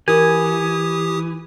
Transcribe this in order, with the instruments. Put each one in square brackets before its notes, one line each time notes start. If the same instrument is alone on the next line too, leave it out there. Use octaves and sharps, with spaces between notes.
[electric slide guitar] E3 [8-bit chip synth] G4 D#6 [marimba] A#4 [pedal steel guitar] G#5